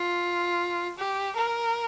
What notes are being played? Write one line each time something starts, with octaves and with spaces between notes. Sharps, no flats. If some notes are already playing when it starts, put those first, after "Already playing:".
Already playing: F4
G4
A#4